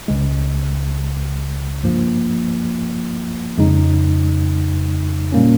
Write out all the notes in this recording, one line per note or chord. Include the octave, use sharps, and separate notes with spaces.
C#2 C#3 G#3
G2 F3 A#3
F2 C#3 G#3 D#4
A#2 G3 A#3 C#4